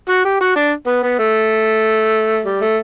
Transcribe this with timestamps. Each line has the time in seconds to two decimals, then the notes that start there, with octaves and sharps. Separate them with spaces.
0.09 F#4
0.25 G4
0.40 F#4
0.56 D4
0.87 B3
1.03 B3
1.19 A3
2.45 G3
2.61 A3